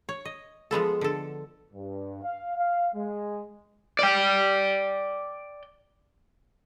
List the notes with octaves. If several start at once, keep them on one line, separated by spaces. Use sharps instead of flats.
C#5
D#5
F3 G#3 B3 A4
D3 A4
G2
F5
F5
G#3
D5 G5